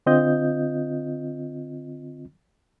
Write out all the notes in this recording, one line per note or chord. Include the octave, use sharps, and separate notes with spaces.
D3 C4 F4 D#5 G6